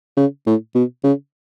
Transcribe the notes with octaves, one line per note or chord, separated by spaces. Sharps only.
C#3
A2
B2
C#3